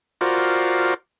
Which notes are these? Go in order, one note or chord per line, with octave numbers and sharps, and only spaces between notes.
F4 F#4 A#4 C5 D5